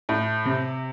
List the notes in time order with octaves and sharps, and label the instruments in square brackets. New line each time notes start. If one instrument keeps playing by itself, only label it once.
[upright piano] A2
C3